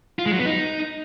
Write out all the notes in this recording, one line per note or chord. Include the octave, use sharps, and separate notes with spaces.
F4
G#3
F#3
B3
D#4